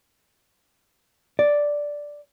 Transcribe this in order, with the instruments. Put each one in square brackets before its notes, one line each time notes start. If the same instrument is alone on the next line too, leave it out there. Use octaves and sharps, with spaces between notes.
[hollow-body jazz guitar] D5